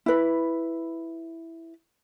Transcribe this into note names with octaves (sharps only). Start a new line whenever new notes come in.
E4 B4